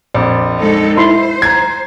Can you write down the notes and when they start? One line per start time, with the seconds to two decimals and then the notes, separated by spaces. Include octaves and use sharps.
0.14 A#1 F2 D5
0.60 G#3 D#4 A4
0.97 E4 C5 B5 C6
1.42 A#5 G#6